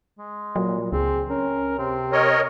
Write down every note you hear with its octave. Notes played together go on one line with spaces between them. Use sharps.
G#3
A#2 F#3
C#2 C4 G#4
C#4 A#4
C3 C4
A#4 C#5 D#5